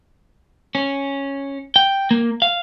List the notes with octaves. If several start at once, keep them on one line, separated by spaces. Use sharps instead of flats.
C#4
G5
A#3
F5